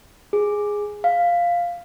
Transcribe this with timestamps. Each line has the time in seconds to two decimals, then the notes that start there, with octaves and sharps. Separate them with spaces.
0.33 G#4
1.04 F5